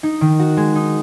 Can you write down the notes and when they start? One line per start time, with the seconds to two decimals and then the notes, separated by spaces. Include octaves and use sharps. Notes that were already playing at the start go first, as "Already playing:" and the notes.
0.03 D#4
0.21 D#3
0.40 F#4
0.57 G#3
0.76 D#4